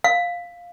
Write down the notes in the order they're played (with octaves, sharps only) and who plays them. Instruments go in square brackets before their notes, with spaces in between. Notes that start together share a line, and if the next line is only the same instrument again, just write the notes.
[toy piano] F5